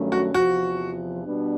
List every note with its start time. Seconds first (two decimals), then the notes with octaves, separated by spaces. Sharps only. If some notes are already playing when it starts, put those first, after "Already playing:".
Already playing: G2 D#3 F#3 A3 C#4
0.12 F#4
0.34 E2 C3 F3 F#4
1.24 B2 G3 B3 D4